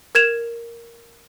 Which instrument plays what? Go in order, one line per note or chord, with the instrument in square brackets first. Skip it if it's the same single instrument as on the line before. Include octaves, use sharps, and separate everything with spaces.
[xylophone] A#4 G#6 E7 F7